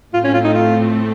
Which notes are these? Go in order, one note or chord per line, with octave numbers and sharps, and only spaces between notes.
A2 A3 C4 F4
C#4
F4
D#4
F4